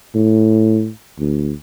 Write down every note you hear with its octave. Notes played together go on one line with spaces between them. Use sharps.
A2
D2